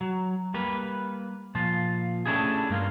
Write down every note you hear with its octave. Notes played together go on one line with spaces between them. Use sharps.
F#3
G3 A#3 B4
A#2 F3 F4
A3 C#4 D4 E4 G4 G#4
G2 A#3 F4